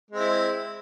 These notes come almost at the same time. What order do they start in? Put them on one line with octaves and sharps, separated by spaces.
G#3 C4 E4